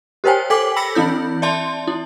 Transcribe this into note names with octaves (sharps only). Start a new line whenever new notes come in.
G4 A#4 C5 C#5 G5 G#5
A4 G5 G#5 D6 B6 F#7
B5 E6 A#6 B6 C#7
E3 C4 E4 G6
D5 E5 A5 C6
E4